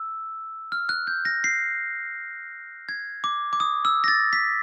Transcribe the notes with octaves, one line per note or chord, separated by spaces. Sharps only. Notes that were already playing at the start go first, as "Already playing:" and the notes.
Already playing: E6
F6
F#6
G6
A#6
C7
G#6
D6
D6
D#6
E6
A#6
A6
B6